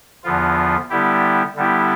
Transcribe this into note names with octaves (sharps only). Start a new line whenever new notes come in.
E2 D3 F3 B3 F4
D3 G3 B3 E4 G4
D3 G3 B3 E4 G4